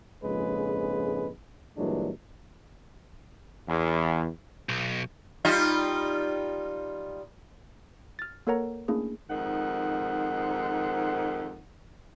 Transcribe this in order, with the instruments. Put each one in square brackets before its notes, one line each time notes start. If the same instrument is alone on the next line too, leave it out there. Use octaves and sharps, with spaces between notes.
[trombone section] A#1 F2 G#2 C#3 G#3 B4
G2 A#2 E3 F#3 G#3 D4
E2
[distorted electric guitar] B1
[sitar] G3 D#4 F4
[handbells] F6 A6
A#3 A4 A#4 C#5 F#5 A#5
A3 A#3 C#4 D4 E4 G#4
[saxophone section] F2 G#2 D#3 F#5